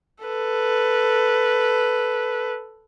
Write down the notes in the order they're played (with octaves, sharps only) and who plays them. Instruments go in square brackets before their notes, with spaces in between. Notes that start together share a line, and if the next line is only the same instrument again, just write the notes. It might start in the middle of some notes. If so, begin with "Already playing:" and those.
[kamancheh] A4 B4